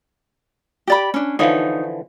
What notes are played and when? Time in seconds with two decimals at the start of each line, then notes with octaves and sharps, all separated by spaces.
0.87 G4 D5 B5
1.14 C#4 D4
1.39 D3 E3 F3 D#4 C#5 F5